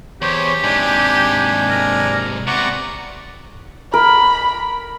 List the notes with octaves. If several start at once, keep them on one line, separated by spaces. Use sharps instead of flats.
E2 G4 C5 C#5
G#2 C3 D4 G#5
A#4
C3 B3 D5 F#5 A#5 C#6
A#4 B5